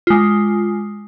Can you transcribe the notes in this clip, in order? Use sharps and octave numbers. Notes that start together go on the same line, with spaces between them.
G#3 F4